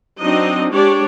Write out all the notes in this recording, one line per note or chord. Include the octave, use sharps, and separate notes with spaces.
F#3 C4 D4 D#4 D#5
G#3 D4 G4 C#5 D5